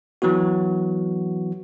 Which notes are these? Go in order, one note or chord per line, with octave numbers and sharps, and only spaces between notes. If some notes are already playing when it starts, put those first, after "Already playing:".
E3 F#3 B3 F#4